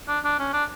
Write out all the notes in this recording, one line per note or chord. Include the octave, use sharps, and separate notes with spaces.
D4
D4
C#4
D4